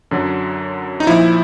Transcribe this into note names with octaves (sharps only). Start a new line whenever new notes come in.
F#2 D3 F#3
D#4
A#2 F3 E4